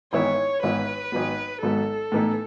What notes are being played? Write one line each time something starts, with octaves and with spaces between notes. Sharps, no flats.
G#1 G#2 E3 B3 E4 C#5
G#1 G#2 E3 B3 E4 B4
G#1 G#2 F#3 B3
G#1 G#2 F#3 B3 A4
A2 E3 B3 D#4